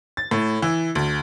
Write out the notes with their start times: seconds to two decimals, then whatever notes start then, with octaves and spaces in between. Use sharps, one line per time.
0.17 A6
0.31 A2
0.62 E3
0.95 D2